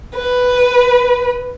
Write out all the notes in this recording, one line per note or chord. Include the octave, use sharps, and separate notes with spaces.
B4